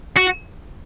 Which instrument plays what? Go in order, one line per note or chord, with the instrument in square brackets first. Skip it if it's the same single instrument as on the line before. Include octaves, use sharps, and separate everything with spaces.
[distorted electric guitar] F#4